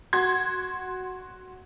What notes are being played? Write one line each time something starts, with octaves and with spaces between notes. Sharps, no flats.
F#4 C6 G#6